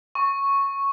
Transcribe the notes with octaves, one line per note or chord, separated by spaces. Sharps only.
C#6